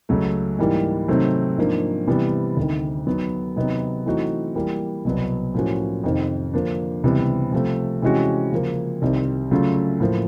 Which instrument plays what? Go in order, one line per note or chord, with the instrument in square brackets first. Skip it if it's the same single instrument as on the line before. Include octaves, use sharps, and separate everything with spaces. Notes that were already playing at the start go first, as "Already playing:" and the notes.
[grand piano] C#2 C#3 F#3 A3
G#2 E3 G3 A#3
C3 D#3 F#3 A3 C4
G#2 F3 A#3 D4
C3 E3 G3 B3
D2 C3 D#3
D#3 F#3 B3
C3 D#3 F#3 B3 D#4
E3 A3 C4 D#4 F#4
E3 G3 A#3
C2 B2 F#3 B3
A2 F3 A#3 C#4 F#4
F2 C3 D#3
D3 F3 A#3 D4
C#2 C3 E3 G3 B3
C3 F3 A3
C3 E3 G#3 C#4 F#4
C#3 F3 A#3
C2 C3 D#3 G3 C4
C#3 F#3 A3 C#4 F4
A2 F3 A#3